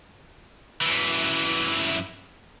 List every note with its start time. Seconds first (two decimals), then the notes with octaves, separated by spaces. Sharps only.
0.81 F#2 E3